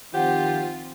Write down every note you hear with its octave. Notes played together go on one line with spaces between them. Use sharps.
D#3 F3 C4 F4 G4 C5 F#5